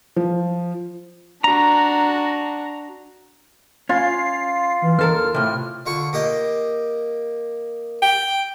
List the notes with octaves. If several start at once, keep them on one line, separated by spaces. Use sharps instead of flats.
F3
D4 F#4 A#5
C#4 F4 C7
E3
D#2 A4 A#4 F6
A2 C3 F6
D3 F4 C#6
A#3 G4 D#5
G5